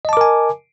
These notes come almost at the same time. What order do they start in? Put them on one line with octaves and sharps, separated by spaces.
D#5 A5 D6 A#4 G#5